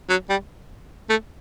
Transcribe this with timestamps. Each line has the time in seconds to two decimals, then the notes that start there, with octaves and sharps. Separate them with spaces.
0.09 F#3
0.29 G3
1.09 A3